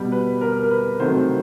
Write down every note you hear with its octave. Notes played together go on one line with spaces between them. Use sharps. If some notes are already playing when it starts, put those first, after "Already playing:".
Already playing: B2 G3
B4
A#4
A#4
B4
C3 D#3 F#3 A3 C5